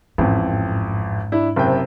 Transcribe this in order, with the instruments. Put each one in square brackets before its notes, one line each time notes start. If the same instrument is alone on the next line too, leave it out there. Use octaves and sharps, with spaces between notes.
[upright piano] A1 F2 [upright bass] G#2
[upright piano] D4 E4
F#1 C3 G5